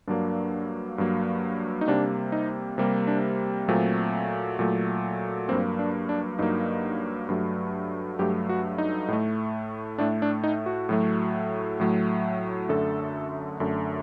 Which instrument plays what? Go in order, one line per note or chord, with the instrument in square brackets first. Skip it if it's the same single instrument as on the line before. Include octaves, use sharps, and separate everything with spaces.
[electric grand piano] G2 F#3 A#3 D4
G2 F#3 A#3
D#4
C3 G3 A#3 D4
D#4
C3 G3 A#3
D4
A#2 F#3 A3 C4
A#2 F#3 A3
G2 F#3 A#3 C4
D4
D4
G2 F#3 A#3 D#4
G2 F#3 A3
G2 F#3 A3 G4
F#4
D#4
A2 A3
A2 A3 D4
D4
D#4
F#4
A2 F#3 A3
A2 F#3 A3
F#2 D3 A3 A4
F#2 D3 A3